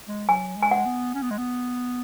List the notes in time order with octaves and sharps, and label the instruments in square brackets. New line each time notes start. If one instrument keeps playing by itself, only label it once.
[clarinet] G#3
[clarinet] F#3 [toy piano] G#5
[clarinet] G#3
[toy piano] G#5
F#5
[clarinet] B3
C#4
B3
G#3
B3